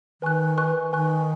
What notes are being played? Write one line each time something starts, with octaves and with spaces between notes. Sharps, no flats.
D#3 B4 G#5 C#6 F#6
B4 G#5 C#6 F#6
D#3 B4 G#5 C#6 F#6